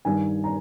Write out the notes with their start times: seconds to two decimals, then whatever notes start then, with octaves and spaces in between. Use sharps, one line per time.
0.05 G2 D#3 G#5
0.44 A#5